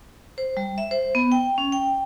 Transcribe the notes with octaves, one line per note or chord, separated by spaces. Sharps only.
C5
G3
E5
C5
B3
G5
C#4
G5